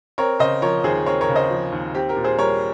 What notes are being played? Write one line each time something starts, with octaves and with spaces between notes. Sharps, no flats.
C4 A#4 C#5
C#3 C5 D#5
F3 A#4 C#5
D#2 G#4 C5
C4 A#4 C#5
A#4 C#5
C#3
C5 D#5
F3
D#2
C4 G4
G4 A#4
A#2
G#4 C5
G3 A#4 C#5